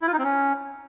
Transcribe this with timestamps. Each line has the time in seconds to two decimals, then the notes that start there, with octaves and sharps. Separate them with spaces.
0.02 E4
0.07 F4
0.13 D#4
0.18 C4
0.24 C#4